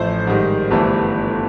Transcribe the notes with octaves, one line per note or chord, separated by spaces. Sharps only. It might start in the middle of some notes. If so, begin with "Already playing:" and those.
Already playing: A1 A2 F3 A3 C5
G#2 D#3 G3
G1 G2 E3 A3